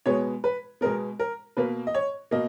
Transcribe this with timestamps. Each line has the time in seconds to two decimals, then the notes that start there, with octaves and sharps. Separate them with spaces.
0.06 B2 G#3 B3 C#5
0.44 B4
0.81 B2 G#3 B3 A#4
1.19 A#4
1.57 B2 A#3 B4
1.87 D#5
1.95 C#5
2.31 B2 A#3 D#5